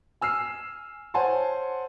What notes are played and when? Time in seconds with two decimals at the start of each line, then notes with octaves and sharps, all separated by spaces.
0.21 G#5 E6 F6 C7
1.14 C5 C#5 F#5 G#5 A5 C6